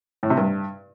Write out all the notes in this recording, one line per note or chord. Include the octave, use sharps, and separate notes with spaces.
A2
C3
G2